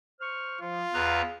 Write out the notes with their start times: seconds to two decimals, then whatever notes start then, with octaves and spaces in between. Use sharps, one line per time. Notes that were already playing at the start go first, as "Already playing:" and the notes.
0.20 C5 C#6 F6
0.61 F3 F4
0.94 E2 G#4 B4 F5 A#5